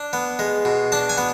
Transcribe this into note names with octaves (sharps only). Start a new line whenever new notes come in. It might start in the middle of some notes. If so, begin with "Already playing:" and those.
Already playing: D4
B3
G#3
B2
D4 A5
G#5
B3